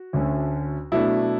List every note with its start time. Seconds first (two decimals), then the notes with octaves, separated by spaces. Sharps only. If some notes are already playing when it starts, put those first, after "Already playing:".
Already playing: F#4
0.13 D2 D3 A3 C#4
0.92 B2 F#3 A3 D4 E4